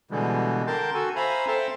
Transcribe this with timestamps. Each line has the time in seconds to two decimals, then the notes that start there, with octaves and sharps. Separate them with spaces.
0.11 B2 D3 E3 G3 G#3
0.67 D3 A#4 G5 A5 C6 G6
0.94 F#4 A4 G#5
1.16 C5 E5 F5 G#5 A#5 B5
1.48 A4 C5 E5 G5 A5 C6